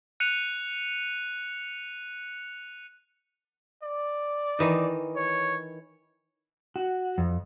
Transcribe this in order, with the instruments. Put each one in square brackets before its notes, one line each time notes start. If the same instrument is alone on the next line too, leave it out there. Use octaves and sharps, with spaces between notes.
[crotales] F#6 C#7 D#7 F7
[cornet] D5
[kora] D#3 E3 D#4
[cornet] C#5
[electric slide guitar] F#4
F2